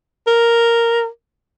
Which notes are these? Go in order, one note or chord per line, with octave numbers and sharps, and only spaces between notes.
A#4